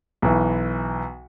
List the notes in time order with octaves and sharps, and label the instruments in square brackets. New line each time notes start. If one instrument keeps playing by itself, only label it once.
[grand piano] B1 E3